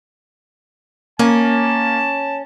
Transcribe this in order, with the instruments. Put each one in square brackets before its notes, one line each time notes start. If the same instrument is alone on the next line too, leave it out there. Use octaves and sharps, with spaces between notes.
[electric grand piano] A#3 [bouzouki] C#4 [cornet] A5